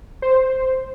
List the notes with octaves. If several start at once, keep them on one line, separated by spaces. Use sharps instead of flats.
C5